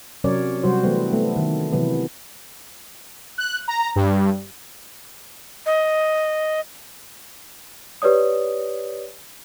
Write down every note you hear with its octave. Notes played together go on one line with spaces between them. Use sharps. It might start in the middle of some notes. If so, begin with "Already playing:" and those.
C3 F#3 C#4 A#4 C#5 D5
C3 F#3 G3 F#4 C5
E3 F#3 A3 B3 C4
A3 B3
D#3
C3 E3 F#3 B3
F#6
A#5
G2
D#5
G4 B4 C#5 D5 D#6